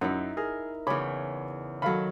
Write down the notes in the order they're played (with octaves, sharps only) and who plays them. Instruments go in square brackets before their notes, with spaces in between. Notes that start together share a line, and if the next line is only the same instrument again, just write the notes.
[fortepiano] F#2 [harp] D#4 E4
[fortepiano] G#4 [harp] A#4
[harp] E2 C#3 [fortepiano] C#5 B5 D6
[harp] D#3 F#3 [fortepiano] A4 F5 B5